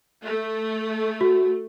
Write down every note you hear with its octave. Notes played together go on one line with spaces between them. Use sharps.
A3
F#4